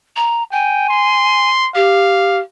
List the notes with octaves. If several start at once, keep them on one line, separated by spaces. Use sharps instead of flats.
A#5
G5 G#5
C6
G4 F5